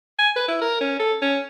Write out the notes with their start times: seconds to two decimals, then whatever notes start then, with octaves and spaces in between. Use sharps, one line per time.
0.19 G#5
0.36 B4
0.48 E4
0.61 A#4
0.81 C#4
0.99 A4
1.22 C#4